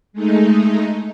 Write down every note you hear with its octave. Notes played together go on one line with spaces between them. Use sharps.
G#3 A3 D#4